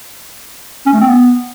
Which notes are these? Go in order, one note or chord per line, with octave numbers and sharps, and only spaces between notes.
C#4
A3
C4
B3